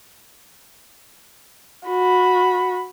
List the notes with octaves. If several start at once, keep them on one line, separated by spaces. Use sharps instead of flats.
F#4 B5